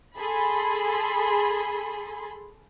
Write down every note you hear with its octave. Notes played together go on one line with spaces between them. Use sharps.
G#4 A4 B5 C6